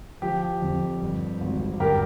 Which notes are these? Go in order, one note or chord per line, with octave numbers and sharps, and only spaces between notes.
F3 G4
F2
G2
G#1
G2 G4 A#4